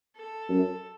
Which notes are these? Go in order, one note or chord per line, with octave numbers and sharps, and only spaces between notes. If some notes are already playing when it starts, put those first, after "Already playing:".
A4
F#2